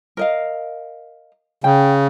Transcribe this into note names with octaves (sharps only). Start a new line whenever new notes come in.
A#4 D#5 F5
C#3 G5